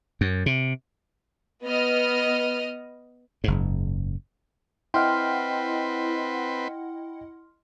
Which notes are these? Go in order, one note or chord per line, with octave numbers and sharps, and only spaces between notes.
F#2
C3
B3 D#5 F6
F#1 G#2
C4 E4 B4 D#5 F#5 G5 C6 F6